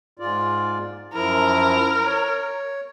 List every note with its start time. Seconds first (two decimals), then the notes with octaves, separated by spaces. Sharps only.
0.19 G#2 F4 D5
1.14 F#2 F3 E4 A#4
2.05 C#5